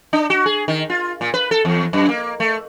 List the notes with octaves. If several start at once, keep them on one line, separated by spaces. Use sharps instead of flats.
D4
F#4
G#4
D#3
F4
A#2
B4
A4
E2
F#2
A#3
A3